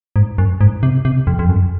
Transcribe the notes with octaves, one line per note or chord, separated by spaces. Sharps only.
G#2
F#2
G#2
C3
C3
F2
F2
F#2